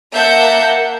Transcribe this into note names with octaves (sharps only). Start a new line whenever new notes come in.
A#3 E5 F#5 A5 G6